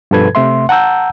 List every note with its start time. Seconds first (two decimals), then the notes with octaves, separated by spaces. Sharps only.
0.11 G2 B2 F3 A4 B4 G#6
0.35 C3 A3 E5 C6
0.69 F#5 A5 A#5 E6 G6